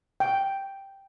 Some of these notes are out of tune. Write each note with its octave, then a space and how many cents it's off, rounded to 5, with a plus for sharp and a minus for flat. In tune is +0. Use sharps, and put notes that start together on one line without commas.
G5 +0